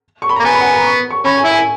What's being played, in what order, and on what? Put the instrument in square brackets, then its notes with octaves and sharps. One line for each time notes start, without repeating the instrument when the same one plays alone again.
[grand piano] C#6
B5
A#5
[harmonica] A#3
[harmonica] B3 [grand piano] G#5
[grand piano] B5
F#5
G#5
A#5
C#6
C#6
[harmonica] C#4 [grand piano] B5
[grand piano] G#5
[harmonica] E4
[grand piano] G#5